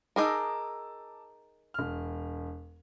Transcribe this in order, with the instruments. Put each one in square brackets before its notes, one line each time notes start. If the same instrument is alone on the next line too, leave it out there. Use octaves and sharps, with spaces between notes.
[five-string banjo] D#4 G#4 A#4 [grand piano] A5 D6 E6
[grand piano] E1 F6